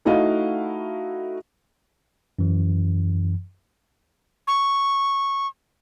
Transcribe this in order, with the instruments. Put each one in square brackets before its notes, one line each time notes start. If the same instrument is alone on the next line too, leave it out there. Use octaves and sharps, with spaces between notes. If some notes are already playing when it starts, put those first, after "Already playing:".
[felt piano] A3 D#4 E4 F#4 D#5 F5
[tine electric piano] F#2 E3
[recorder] C#6